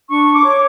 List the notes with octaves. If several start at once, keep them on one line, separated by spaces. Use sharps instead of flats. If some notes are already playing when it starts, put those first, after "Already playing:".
D4 C#6
D6
C#5